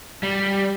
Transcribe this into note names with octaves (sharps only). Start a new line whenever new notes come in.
G3